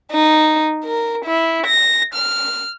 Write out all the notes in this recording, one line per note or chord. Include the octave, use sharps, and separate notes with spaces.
D#4
A#4
E4
A#6
F6